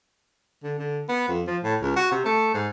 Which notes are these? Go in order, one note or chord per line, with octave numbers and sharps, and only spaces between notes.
D3
D3
B3
F2
F3
A2
C#2
F#4
C3
A3
G#2